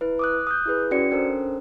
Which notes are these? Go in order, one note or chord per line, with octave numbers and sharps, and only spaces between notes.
E4 B4
D6 D#6 F#6
D#6 F#6 G6
E4 G#4 B4
C#4 F#4 D5 C#7
C#4 D4 A4 A#4 C5